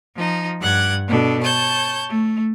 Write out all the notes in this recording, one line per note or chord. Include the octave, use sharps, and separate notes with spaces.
F3 D#4
G2 F#5 F#6 G#6
B2 D4 A4
C#5 A5 G6
A3